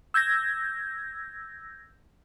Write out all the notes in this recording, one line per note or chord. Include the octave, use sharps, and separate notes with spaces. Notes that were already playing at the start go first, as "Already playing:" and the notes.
E6 G6 G#6 A#6